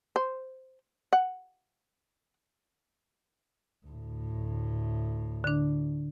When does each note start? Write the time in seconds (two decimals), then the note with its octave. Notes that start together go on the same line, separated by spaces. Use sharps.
0.16 C5
1.13 F#5
3.86 D2 A2
5.44 D3 D4